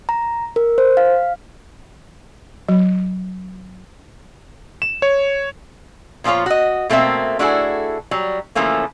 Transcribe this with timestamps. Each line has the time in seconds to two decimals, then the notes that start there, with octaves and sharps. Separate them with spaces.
0.09 A#5
0.56 A#4
0.78 C5
0.97 F5
2.69 F#3
4.82 E7
5.02 C#5
6.24 A#2 F3 G3 F4 C#5
6.46 F#4 D#5
6.89 B2 A3 A#3 C4 E5
7.39 A3 D4 E4 F#4 G#4 A4
8.11 F#3 G3
8.55 C#3 E3 F3 A3 A#3 C#4